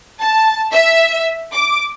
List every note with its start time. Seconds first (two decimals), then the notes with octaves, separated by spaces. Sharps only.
0.20 A5
0.72 E5
1.53 D6